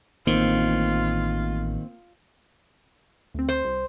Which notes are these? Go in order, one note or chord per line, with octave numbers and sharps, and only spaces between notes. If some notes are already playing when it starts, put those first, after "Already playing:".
A1 D#3 A#3 C4 F4
D2 C4
C5
C2